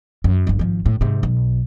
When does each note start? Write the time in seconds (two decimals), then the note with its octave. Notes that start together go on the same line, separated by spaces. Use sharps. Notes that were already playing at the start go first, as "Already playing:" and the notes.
0.24 F#2
0.47 F#1 G2
0.59 G#1 F3
0.86 A2
1.01 G#2 C3
1.23 B1